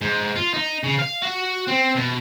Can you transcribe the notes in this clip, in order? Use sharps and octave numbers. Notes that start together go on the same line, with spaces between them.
G#2
F4
D#4
C#3
F5
F#4
C4
B2